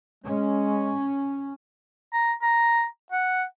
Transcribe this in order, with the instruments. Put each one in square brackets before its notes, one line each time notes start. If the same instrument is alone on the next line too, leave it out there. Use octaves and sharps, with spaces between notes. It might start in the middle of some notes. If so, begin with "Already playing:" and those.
[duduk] G#3 [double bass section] C#4
[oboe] A#5
A#5
F#5